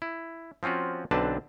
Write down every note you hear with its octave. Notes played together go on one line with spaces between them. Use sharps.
E4
F3 C4 C#4 F4 F#4
B1 D3 C4 D4 B4 A5